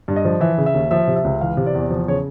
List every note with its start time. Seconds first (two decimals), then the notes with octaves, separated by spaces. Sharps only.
0.08 G2
0.16 D#5
0.25 F3
0.41 E3 E5
0.58 C#3
0.66 E5
0.74 D#2
0.91 F3 E5
1.07 C3
1.16 E5
1.24 C#2
1.41 E3 F5
1.57 C3
1.66 D5
1.74 E2
1.91 F3
2.08 C#3 C#5